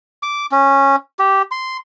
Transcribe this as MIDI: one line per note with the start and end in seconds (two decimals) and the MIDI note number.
0.23 0.46 86
0.52 0.96 61
1.19 1.42 67
1.51 1.77 84